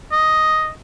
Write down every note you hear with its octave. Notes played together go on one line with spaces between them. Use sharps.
D#5